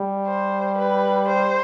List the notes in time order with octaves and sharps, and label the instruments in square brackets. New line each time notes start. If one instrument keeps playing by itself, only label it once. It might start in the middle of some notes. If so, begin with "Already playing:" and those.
Already playing: [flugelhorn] G3
[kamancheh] C5
B4
C5